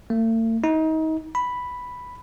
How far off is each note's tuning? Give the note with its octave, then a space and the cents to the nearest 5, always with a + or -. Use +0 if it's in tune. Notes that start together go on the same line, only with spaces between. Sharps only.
A3 +45
D#4 +30
B5 +0